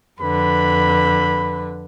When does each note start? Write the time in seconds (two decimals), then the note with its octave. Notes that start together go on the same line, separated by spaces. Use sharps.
0.21 F2 D3 B4 B5